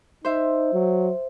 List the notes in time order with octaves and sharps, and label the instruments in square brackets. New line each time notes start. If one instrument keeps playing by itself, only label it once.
[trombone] D#4 [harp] C5 E5
[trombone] F#3